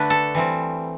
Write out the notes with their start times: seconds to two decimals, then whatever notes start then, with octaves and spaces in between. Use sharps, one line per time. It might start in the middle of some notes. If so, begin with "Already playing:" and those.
Already playing: D3 A3 D4 B4
0.10 A4
0.35 E3 G3 C4